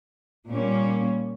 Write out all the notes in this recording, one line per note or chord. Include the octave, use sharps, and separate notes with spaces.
A#2 G3 A#3 C#4